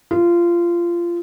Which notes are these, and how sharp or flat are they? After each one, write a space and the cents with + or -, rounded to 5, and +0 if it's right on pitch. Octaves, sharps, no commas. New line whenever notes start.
F4 -20